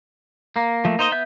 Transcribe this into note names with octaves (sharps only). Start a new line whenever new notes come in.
A#3
F3 A3
D#4 C5 D#5
B3 E5 G6